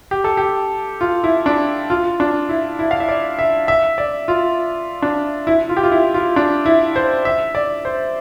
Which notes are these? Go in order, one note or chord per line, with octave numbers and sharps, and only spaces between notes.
G4
A4
G4
F4
E4
D4
F4
D4
E4
E4
F5
E5
D5
E5
E5
D5
F4
D4
E4
F4
G4
F4
E4
F4
D4
E4
C5
E5
D5
C5